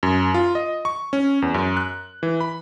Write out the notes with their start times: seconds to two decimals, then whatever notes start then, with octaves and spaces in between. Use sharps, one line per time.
0.03 F#2
0.34 F4
0.55 D#5
0.85 C#6
1.13 C#4
1.42 E2
1.54 F#2
1.77 F#6
2.23 E3
2.41 B5